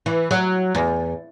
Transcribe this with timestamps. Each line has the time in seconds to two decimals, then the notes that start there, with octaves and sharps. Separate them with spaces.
0.06 E3
0.31 F#3
0.75 E2